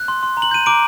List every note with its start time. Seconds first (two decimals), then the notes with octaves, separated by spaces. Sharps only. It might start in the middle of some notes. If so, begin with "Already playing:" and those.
Already playing: F#6
0.08 C6
0.23 C6
0.37 A#5
0.42 F#7
0.51 G6 D#7
0.66 A#5 D6 D7